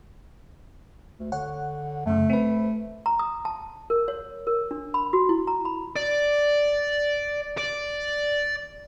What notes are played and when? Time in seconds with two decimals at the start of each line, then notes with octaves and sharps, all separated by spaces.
1.19 D2
1.32 D3 C#5 F#5
2.06 F#2 C#3 A3
2.30 C4 B4
3.06 A#5
3.19 D#6
3.45 A5
3.90 A#4
4.08 C#5
4.47 A#4
4.71 D4
4.94 B5
5.13 F#4
5.29 E4
5.47 A#5
5.65 B5
5.96 D5
7.58 D5